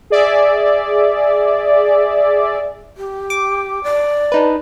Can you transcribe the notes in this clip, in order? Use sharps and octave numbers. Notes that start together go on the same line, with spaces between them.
G#4 D5 E5
G4
D6
D5
D4 D#4 B4